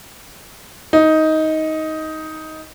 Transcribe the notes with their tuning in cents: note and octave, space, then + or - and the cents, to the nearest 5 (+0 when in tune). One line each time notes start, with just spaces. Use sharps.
D#4 +15